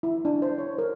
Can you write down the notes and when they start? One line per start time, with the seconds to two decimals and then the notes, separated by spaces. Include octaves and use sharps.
0.03 E4
0.25 D4
0.42 C5
0.58 C#5
0.78 A#4